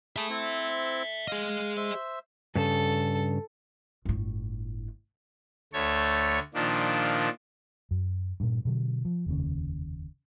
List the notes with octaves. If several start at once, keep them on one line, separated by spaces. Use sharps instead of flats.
G#4 E5 A5 B5
C4 E4 C5
G#4 D#5 F5
C5 E5
G2 C#3 A4
G1 A2
D2 A3 A4 C#5 C#6
A#2 D#3 F3 D4
F#2
G2 A#2
B2 D3 F#3
F3
F1 D#2 C#3